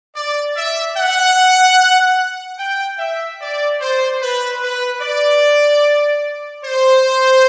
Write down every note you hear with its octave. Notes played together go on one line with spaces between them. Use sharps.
D5
E5
F#5
G5
E5
D5
C5
B4
B4
D5
C5